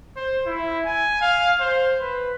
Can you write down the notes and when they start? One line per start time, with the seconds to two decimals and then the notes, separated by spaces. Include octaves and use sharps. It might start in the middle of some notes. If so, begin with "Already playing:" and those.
0.16 C5
0.46 E4
0.85 G#5
1.21 F5
1.60 C5
2.00 B4